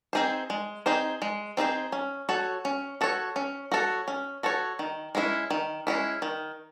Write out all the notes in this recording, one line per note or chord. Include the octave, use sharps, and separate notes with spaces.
C4 D#4 G#4 C5
G#3
C4 D#4 G#4 C5
G#3
C4 D#4 G#4 C5
C#4
F#4 A4 C#5
C#4
F#4 A4 C#5
C#4
F#4 A4 C#5
C#4
F#4 A4 C#5
D#3
G#3 C#4 E4
D#3
G#3 C#4 E4
D#3